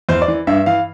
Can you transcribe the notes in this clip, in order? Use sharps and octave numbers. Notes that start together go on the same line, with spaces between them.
E2 C5
D5
E3
G2 E5
E3 F5